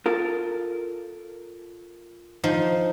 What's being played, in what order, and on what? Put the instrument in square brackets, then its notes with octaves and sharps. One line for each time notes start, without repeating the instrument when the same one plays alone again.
[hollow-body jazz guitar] F4 A4 A#4
[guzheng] F3 D#4